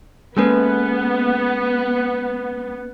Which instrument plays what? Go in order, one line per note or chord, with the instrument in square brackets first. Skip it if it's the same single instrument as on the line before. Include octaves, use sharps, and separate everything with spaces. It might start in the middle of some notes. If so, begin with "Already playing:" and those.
[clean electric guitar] G#3 A4 G#5 [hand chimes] A#3 C#4 B4 [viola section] B3